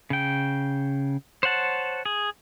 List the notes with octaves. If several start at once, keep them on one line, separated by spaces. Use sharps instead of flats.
C#3 G5
C5 C#5 F#5 A5
G#4